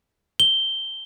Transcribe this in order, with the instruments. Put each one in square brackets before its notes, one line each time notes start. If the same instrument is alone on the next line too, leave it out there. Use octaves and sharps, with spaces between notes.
[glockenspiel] G7